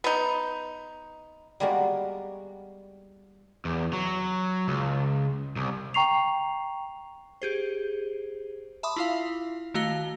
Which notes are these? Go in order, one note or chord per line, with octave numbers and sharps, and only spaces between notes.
B3 D#4
G3 G#3 A#3 B3 F#4
E2
F#3
C#2
C2
G5 A#5 C#6 C7 F7
G4 G#4 C5
E5 A5 B5 C6 D6 D#6
E4 F4 F5
D#3 A3 F#4 F5 A#6 G7